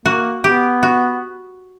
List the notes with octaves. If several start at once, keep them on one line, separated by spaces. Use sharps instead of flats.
A#3 F#4
B3 G4
F#4